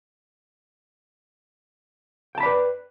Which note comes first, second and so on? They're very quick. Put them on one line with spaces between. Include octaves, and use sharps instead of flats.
G5 A5 B5 D5 B4